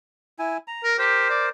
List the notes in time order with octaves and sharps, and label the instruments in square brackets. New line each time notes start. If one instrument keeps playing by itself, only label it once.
[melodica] E4 G#5
A#5
[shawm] A#4
[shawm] G4 [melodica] A#4 C5
[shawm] D5